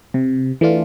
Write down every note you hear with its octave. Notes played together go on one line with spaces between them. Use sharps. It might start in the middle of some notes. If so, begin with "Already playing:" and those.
C3
E3 A3 D4 F4